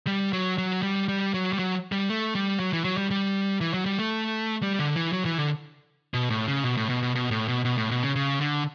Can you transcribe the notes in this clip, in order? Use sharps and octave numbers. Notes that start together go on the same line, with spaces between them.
G3
F#3
F#3
G3
G3
F#3
G3
F#3
G3
A3
G3
F#3
E3
F#3
G3
G3
E3
F#3
G3
A3
G3
D3
E3
F#3
E3
D3
B2
A2
C#3
B2
A2
B2
B2
B2
A2
B2
B2
A2
B2
C#3
C#3
D3